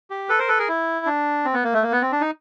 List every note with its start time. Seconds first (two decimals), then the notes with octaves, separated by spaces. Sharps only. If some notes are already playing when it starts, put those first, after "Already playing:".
0.10 G4
0.29 A4 B4
0.39 A#4 C5
0.48 A4 B4
0.58 G#4 A#4
0.69 E4
1.06 D4
1.45 C4
1.54 B3
1.64 A#3
1.73 A3
1.83 A#3
1.92 B3
2.02 C4
2.12 D4
2.21 D#4